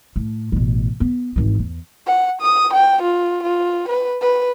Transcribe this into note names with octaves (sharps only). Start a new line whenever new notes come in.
A2
A1 B2
B3
G#1 E3
E2
F#5
D#6
G5
F4
F4
B4
B4